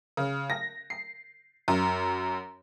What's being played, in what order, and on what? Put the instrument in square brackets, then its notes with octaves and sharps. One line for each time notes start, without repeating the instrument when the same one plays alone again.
[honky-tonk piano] C#3
A#6
C7
F#2